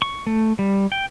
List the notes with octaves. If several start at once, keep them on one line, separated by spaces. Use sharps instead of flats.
C#6
A3
G3
G5